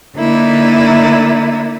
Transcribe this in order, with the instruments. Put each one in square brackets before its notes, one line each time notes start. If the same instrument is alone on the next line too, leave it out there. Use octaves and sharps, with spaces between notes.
[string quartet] D3 A#3 D#4 E4